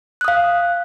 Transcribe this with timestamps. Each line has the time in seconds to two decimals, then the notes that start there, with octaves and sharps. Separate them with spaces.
0.21 F#6
0.25 D#6
0.28 F5